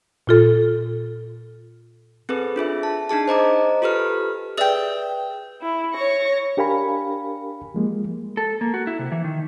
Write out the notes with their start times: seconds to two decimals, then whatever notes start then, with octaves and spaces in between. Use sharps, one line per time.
0.27 A#2 F4 A4
2.29 C4 G#4 A4 B4
2.56 D4 F4 G#4 E5
2.83 A5
3.09 D4 D#4 G#4 A5
3.28 C5 D#5 A#5 D6
3.82 F4 G4 A4 B4 F6
4.58 G#4 B4 D5 E5 G5
5.61 E4
5.93 C#5 C#6 A#6
6.57 D4 G4 A#4 F5 G#5 B5
7.75 F3 G#3 A#3
8.37 A4
8.61 A#3
8.74 F#4
8.87 E4
8.99 C3
9.12 E3
9.24 D#3